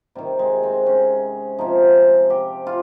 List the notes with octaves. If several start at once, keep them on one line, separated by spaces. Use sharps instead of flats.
C3 D#3 G3
G#3
C4
C#4
C3 F3 D#4
G4
F4